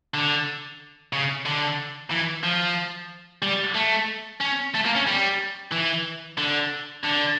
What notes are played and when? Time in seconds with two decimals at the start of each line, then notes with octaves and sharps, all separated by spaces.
0.14 D3
1.13 C#3
1.45 D3
2.11 E3
2.44 F3
3.42 G3
3.75 A3
4.40 C#4
4.74 A3
4.85 A#3
4.95 C#4
5.07 G3
5.72 E3
6.38 D3
7.04 D3